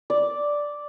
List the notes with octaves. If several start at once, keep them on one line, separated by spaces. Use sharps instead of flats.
D5